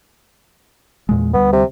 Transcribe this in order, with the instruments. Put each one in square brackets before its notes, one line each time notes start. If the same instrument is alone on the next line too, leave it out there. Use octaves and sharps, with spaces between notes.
[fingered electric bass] E2 A#2 G#3
[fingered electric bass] D2 G3 [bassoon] B3
[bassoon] C3